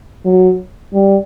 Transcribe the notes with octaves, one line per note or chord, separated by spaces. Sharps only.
F#3
G3